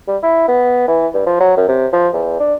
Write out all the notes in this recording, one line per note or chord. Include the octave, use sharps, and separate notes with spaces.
G3
E4
B3
E3
G2
F3
F#3
F#2
C3
F3
E2
D4